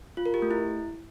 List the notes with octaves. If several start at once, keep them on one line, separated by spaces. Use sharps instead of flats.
F4
A#4
G4
A3
E4